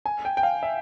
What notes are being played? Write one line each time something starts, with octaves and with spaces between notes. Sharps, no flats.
G#5
G5
G5
F5
E5